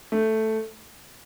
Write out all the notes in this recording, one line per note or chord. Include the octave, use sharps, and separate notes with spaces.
A3